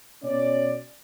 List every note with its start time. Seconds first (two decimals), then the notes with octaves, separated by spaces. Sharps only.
0.23 B2 C#4 D5